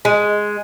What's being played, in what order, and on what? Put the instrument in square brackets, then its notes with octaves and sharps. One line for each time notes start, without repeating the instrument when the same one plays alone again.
[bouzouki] G#3